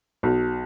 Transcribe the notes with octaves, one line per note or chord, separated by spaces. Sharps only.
B1